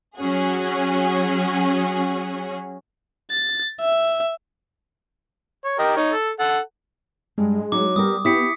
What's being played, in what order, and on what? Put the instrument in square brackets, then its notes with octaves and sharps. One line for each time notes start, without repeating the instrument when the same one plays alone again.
[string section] F#3 C#4 F#4 G#4
[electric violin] A6
E5
[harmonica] C#5
G4 A#4 D#5
D#4 C#5
A4
A4 F#5
[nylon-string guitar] G2 [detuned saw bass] G#3
[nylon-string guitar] F#3 D#4 [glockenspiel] D6
[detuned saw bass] G3 [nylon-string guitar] B3 G4 A#4 [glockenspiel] D#6
[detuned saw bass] B3 [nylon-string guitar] E4 G4 [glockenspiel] D#6 B6 C#7